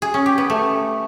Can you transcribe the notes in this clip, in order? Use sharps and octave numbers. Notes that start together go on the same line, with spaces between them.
G#4
C#4
G4
B3
A3